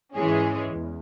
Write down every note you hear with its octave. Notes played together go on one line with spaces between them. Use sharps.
G#2 E3 G#3 C#4 G#4
E2